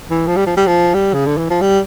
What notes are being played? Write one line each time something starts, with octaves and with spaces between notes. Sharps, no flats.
E3
F3
G3
F3
G3
F3
G3
C#3
D3
E3
F3
G3